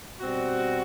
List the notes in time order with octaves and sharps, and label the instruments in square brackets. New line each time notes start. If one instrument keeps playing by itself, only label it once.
[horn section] B2 G3 C4 F#4